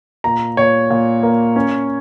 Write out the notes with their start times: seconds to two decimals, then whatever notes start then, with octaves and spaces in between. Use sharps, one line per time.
0.24 A#2 A#5
0.57 A#2 C#5
0.90 A#2
1.23 A#3
1.56 C#4